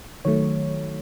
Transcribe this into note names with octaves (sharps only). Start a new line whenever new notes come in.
D#3 F#3 A3 C#5